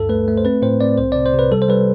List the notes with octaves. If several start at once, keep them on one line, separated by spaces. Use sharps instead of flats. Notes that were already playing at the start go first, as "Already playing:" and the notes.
Already playing: D2 G2 A4
A3 B4
A3
C5
C4 B4
A2 C5
C4 D5
C2 C5
C3 D5
C5
C3
B4
G3 A4
C5
G3 B4